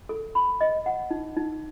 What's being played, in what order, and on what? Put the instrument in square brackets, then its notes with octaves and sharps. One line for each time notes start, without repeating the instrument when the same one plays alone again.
[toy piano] A4
B5
D#5
F#5
D#4
D#4